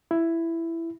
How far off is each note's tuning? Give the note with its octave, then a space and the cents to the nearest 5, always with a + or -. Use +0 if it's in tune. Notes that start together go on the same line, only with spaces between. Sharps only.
E4 +10